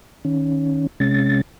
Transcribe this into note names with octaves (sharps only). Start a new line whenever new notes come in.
D#3 C#4
C3 G#3 C#4 A6